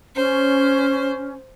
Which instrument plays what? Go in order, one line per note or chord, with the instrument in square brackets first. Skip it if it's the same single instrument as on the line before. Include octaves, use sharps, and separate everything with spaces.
[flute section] C#4 [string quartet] C5